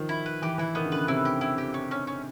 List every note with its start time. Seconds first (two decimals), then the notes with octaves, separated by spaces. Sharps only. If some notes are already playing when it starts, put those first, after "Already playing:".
Already playing: D#3 F3
0.09 E4
0.26 B4
0.42 E3 G4
0.58 E3 E4
0.75 D#3 B3
0.85 C#3
0.92 D3 B4
1.08 C3 E4
1.25 G4
1.41 E4
1.58 G4
1.74 C#4
1.91 C#4
2.07 C#4